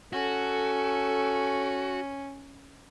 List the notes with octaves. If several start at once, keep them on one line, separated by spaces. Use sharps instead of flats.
C#4 F#4 A4